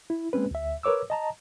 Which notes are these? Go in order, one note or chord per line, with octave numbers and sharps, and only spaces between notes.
E4
G#3 A#3 C4 C#4 B4
D2 E5
A#4 B4 C#5 D6 E6
D#5 A5 A#5